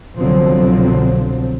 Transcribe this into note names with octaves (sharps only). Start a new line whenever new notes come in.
C2 B2 D3 F3 F#3 C4